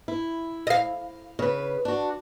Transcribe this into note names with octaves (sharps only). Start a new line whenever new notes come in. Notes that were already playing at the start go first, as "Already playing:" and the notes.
E4
D#5 F5
C#3 B4
D4 F#4